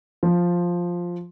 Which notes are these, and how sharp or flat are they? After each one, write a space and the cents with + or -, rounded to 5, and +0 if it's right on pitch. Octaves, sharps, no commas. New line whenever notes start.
F3 +5